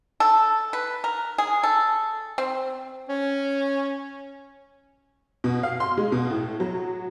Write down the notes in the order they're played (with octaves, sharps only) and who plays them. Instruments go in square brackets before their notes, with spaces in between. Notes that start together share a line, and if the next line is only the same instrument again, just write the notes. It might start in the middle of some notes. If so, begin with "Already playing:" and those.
[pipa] A4
B4
A#4
G#4
A4
C4
[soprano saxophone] C#4
[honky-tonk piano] B2
F5
C6
G#3
B2
A2
F#3